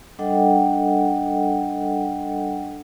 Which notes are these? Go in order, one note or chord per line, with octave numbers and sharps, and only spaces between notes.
G3 D4 A4 D#5 F#5 G5